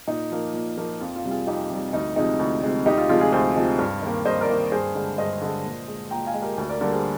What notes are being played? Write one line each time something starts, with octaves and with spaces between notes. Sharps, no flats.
A#2 D#4
F3 A#3
A#2
F3 A#3
F2 F4
F4
C3 G3
F4 G#4
F2 D#4 G4
C3 G3
D2 D#4
C3 F3 G#3 D#4
D2
C3 F3 G#3
D2 D#4 G4
F4
C3 F3 G#3 F4
F4 G#4
D2 G#4 C5
C3 F3 G#3
G2
D#3 A#3
G2 C5 D#5
A#4 D5
D#3 A#3
G2 G#4 C5
D3 G#3
G2 C5 D#5
D3 G#3
A#2
G#3
A#2 G5 A#5
F5 G#5
G#3
G4 A#4
D2
A#4 D5
D3 G3 A#3 A#4 D5
G#4 C5